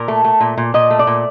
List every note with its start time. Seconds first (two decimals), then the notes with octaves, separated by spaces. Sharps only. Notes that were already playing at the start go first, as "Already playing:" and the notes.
Already playing: A#2 A#4
0.08 A3
0.24 A3
0.41 A#2
0.57 A#2
0.74 A#2 D#5
0.91 A3
0.99 D5
1.07 A#2